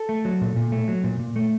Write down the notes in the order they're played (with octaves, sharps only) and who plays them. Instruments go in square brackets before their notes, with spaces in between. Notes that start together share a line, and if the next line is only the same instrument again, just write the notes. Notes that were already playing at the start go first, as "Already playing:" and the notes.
Already playing: [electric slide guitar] A4
A3
F#3
A#2
A#2
A3
F#3
A#2
A#2
A3